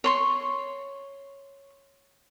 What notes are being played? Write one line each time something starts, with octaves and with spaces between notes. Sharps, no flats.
C#5 C6 C#6